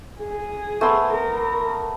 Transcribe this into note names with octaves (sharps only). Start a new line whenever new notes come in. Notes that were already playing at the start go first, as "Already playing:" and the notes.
G#4
A3 B3 C6
A#4